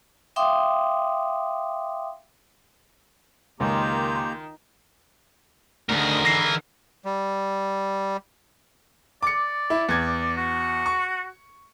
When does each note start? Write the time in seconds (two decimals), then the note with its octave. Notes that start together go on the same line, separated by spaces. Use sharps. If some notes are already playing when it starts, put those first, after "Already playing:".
0.36 E5 F5 G5 C6 D6 D#6
3.60 C#2 D#3 A#3 G4 A#5 C6 G6
5.89 D2 D3 D#3 G#4 A#4
6.25 E3 A#6 C7
7.05 G3
9.23 D5 D6 C#7
9.70 E4
9.89 E2 G#6
10.37 F#4
10.86 C#6